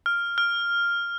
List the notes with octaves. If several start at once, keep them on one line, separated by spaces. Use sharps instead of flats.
F6
F6